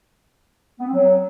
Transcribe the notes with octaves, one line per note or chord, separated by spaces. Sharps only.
B3
C4
F#3